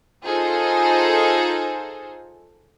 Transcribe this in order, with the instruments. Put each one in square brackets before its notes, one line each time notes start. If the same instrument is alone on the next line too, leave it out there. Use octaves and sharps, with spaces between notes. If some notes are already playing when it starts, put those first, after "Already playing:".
[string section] D#4 F4 G#4 A4 C5